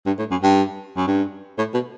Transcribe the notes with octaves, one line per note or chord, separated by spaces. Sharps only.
G2
A2
F#2
G2
F#2
G2
A2
B2